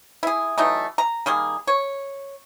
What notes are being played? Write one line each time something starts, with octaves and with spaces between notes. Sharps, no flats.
E4 G#4
E3 F#3 A3 D#4
A#5
D#3 G3 A#3 G#4
C#5